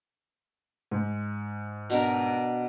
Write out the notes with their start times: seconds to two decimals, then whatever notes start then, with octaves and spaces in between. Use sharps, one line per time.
0.91 G#2
1.90 B2 D4 A#4